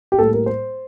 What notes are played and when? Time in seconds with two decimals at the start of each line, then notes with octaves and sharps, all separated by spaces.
0.12 G4
0.19 A2 G3 A#3 A4
0.33 A#4
0.46 C5